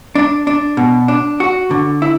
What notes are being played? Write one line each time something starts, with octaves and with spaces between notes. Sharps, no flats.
D4
D4
B2
D4
F#4
D3
E4